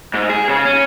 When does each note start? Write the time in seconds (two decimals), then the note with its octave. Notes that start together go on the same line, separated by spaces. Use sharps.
0.14 G#2
0.29 G#4
0.48 C#3
0.65 C#4